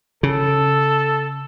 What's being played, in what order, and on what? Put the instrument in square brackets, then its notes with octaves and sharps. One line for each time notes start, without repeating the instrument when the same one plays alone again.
[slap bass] C#3 [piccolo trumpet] A4